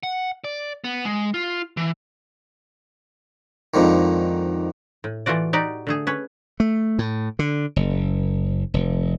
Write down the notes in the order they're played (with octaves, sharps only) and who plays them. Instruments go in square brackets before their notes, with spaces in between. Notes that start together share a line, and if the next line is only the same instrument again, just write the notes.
[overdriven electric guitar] F#5
D5
B3
G#3
F4
E3
[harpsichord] F2 G#2 D3 D#3
[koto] A2
E3 A3 F4 F#4 D5
D#4 F#4 G4 D5
D3 A3 G#4
C#4 B4 C#5
[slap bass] A3
A2
D3
F#1
F1